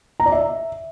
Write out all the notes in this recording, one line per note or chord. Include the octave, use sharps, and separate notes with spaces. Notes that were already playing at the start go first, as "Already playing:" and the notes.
A#5
D5
E5